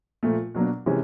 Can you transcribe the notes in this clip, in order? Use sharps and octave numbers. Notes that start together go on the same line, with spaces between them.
A#2 F3 A3
B2 F#3 A#3 D4
C3 E3 G#3 C#4